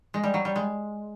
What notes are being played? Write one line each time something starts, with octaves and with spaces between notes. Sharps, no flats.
G#3
G3
F#3
G3
G#3